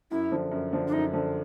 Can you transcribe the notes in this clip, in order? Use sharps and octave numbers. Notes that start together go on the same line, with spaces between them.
F#2 E4
D3 F3
F#2
D3 F3
D4
F#2 D#4
D3 F3